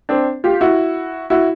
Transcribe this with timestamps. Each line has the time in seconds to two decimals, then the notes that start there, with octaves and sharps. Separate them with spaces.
0.09 C4 D4
0.44 F4 G4
0.61 E4 F#4
1.30 E4 F#4